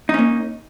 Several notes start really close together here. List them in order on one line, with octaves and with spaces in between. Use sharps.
D#4 C#4 A#3